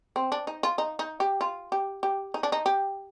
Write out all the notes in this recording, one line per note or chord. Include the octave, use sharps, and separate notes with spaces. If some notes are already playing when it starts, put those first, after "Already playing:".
C4
D4
D#4
F4
D#4
D#4
G4
F4
G4
G4
D#4
D4
D#4
G4